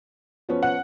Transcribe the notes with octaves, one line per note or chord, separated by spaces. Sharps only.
F3 B3 C#4
F#5